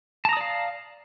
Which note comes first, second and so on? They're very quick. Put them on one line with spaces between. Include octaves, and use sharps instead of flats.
A5 A#5 D#6 D5 F5